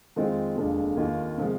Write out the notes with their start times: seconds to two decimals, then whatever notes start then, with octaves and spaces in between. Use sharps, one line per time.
0.16 F2 D#3 G#3 C4 F4
0.56 F1 D#2 D3 G#3 D4
0.96 D#2 D#3 A#3 F4
1.37 C3 F3 G#3